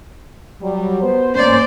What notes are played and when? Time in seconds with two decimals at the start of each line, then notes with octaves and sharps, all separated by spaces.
0.61 F#3 G3
1.02 B3 C5
1.35 A#3 C#4 C5 D5